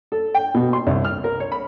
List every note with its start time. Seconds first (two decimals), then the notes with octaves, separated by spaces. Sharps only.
0.12 A4
0.34 G5
0.54 B2
0.73 C6
0.87 C2
1.05 F6
1.24 A#4
1.40 C#5
1.52 B5